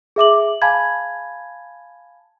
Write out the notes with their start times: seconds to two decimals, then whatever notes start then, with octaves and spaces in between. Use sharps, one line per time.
0.16 G#4 E5 D6 F#7
0.62 F5 G#5 A5 B5 G#6